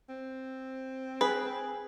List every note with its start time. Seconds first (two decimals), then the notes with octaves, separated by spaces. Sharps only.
0.09 C4
1.21 G#4 B4